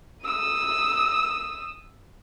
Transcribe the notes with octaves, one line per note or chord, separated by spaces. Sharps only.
D#6 E6